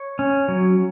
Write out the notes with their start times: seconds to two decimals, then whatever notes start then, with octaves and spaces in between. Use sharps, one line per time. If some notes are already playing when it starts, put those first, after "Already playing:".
Already playing: C#5
0.19 C#4
0.48 F#3